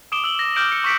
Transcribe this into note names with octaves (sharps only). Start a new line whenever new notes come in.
D6 D#6 D7 E7 G7
E6 F#7 G7
A#6
D6 F6 G6 D7 E7 F#7
C#7 G7
C#6 E6 B6 C#7 D7